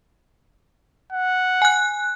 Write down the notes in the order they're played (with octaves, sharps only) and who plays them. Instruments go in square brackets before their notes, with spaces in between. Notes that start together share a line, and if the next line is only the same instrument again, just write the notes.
[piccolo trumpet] F#5
[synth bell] G#5 F#6